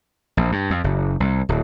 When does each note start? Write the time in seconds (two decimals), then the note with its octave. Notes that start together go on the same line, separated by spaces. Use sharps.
0.37 A#1
0.52 G2
0.70 F2
0.84 F#1
1.20 C2
1.49 D1